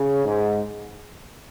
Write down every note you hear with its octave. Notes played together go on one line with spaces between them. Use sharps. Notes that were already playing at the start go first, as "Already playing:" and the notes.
Already playing: C#3
G#2